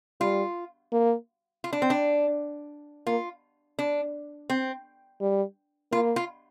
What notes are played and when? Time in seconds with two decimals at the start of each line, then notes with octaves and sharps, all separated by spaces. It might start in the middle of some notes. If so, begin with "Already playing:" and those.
0.21 G3 F4
0.93 A#3
1.64 F4
1.73 D4
1.82 C4
1.90 D4
3.06 A#3 F4
3.79 D4
4.50 C4
5.21 G3
5.92 A#3 F4
6.16 F4